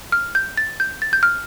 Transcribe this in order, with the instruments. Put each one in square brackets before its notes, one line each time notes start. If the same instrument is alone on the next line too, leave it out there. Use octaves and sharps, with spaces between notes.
[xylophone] F6
G6
A6
G6
A6
G6
F6